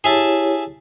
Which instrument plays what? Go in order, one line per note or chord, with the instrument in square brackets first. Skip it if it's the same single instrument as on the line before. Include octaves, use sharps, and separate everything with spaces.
[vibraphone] E4 G4 C#5 [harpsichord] G#4 E5 A5